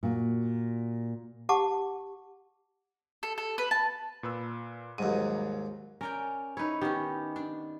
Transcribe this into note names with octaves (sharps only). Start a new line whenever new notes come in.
A#2 F#4
G4 F#5 A5 D6
A4
A4
B4
A5
A#2 B4 E6
D#2 G#2 F#3 G3 D#7
C#4 A#4 D5 G5
D#4 E4 B4 C#5
D#3 B3 C#4 G4
D4